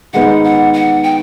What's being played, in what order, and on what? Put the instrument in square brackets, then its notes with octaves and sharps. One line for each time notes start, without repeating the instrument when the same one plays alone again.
[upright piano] D#3 G#3 B3 D#4 [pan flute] F#5
[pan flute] F#5
F#5
G5